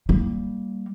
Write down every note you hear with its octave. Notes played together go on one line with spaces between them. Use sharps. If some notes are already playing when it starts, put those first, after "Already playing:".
G3 A#3